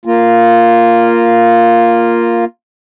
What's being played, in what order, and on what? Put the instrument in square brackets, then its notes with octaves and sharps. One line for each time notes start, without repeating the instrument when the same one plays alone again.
[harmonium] A#3 F4